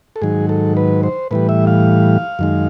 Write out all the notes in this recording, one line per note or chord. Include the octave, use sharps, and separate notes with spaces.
A4
G#2 D#3 F#3 G#4
A4
B4
C5
A2 E3 G3 B4
E5
F5
F#2 D#3 G#3